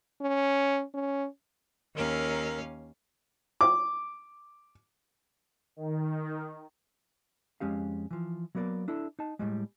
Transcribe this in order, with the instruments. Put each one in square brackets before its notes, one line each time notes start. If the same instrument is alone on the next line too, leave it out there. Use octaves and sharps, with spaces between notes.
[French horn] C#4
C#4
[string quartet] D#2 C#4 F5 [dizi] A#4
[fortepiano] D6
[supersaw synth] D#3
[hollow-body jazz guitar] F2 G#3 C#4 G4 F5
E3 F3
F#3 A#3 B3 A#4 D5
D4 E4 A4
D#4 A5
A2 G3 G#3